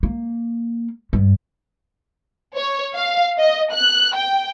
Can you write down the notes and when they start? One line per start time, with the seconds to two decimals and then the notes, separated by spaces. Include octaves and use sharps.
0.03 A#3
1.13 G2
2.55 C#5
2.95 F5
3.37 D#5
3.72 F#6
4.14 G5